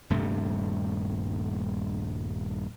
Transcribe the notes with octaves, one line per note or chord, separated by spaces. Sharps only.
D#1 G2 C3 A3